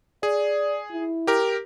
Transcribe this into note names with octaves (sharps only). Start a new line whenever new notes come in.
G#4 D5
E4
G4 A#4